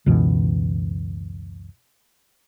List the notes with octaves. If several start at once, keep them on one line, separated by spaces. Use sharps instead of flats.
C#2 F#2 B2 E3